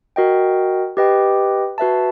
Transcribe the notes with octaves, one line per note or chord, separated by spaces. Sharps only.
F#4 A#4 D#5 G5
G4 B4 D#5 G5
F#4 B4 E5 A5